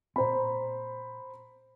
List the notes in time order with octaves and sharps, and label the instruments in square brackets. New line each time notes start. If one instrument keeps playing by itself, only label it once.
[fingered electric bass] A#2 C4 [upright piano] C5 A#5 B5